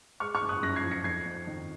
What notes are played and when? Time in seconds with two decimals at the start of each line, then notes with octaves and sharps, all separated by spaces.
0.20 G#3 C#6 F6
0.35 C#6 F6
0.41 F#1
0.49 D#6 F#6
0.63 F#2 F#6 A#6
0.76 G#6 C7
0.83 F3
0.91 A#6 C#7
1.04 F2 G#6 C7
1.26 F2
1.47 D#3